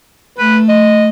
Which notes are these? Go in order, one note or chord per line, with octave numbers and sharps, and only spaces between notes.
A3 B4
D#5